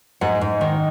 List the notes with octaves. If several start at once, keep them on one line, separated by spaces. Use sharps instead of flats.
G#2 F#5
G#2
D#3